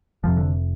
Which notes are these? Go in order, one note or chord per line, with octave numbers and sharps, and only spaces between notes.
F1 F2 C3 F3
D3